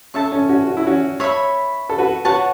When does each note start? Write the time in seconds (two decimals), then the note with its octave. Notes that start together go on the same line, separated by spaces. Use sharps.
0.14 C#4 A4 E5 A5 C#6
0.32 C#4
0.49 C#4 F#4
0.67 F#4
0.77 E4
0.86 C#4 F#4
1.20 C#5 E5 B5
1.89 A4
1.98 F#4 B4
2.25 F#4 B4 C#5 F#5 A5